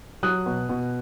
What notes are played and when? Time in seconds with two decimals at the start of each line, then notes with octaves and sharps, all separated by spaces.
0.23 F#3 D#6 F#6
0.46 B2
0.69 B2